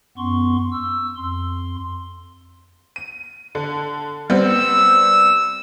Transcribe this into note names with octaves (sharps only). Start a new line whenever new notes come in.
F#2 B3 C6 C#6
E6
F2 C6
D#7
D3
G3 B3 C4 E6